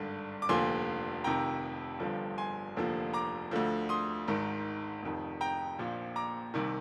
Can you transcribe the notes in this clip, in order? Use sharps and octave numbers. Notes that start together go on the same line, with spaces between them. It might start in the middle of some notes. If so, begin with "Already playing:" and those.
Already playing: G#1 G2 D3
D6
F1 D#2 D3 F3 G#5 C6
F1 F2 C3 D#3 G5 A#5
G1 G2 D3 F3
G#5 C6
F1 D#2 D3 F3
A#5 D6
D2 D3 F3
C6 D#6
G#1 G#2 D#3
F1 F2 D#3
G5 A#5
A#1 A#2 F3
A#5 D6
C2 C3 D#3